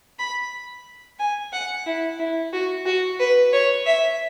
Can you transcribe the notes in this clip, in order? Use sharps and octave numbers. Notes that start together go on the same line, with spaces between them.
B5
G#5
F#5
E4
E4
F#4
F#4
B4
C#5
E5